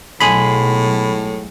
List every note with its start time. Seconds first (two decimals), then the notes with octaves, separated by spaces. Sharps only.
0.20 B1 A2 G#3 G#4 F#5 B5